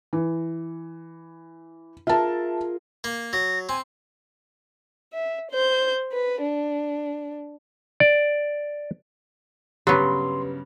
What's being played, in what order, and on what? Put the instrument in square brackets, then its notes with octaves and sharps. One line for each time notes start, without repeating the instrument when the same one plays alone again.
[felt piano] E3
[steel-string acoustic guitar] F4 G#4 A#4 [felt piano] E5 A5
[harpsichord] A#3
[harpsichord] F#3 [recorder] A#6
[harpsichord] C4 [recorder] G#5
[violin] E5
C5 G6
B4
D4
[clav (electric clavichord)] D5
[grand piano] G2 C#3 [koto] F#3 B3 [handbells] G4 B4 [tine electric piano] C6